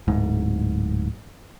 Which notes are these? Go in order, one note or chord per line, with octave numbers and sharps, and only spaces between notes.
D1 G#2